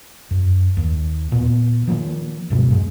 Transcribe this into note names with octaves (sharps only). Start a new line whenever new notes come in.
F#2
D#2
A#2 B3
D#3 F3 A#3
D2 G2 B2 G#3
F#2 A#2 G#3